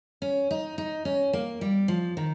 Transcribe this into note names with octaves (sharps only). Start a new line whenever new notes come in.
C#4
D#4
D#4
C#4
A#3
G3
F3
D#3